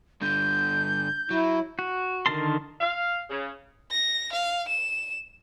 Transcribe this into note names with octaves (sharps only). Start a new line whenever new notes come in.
G2 D3 G6
F#3 E4
F#4
D3 D#3 A#4 A5 C6
F5
C#3
A#6
F5
E7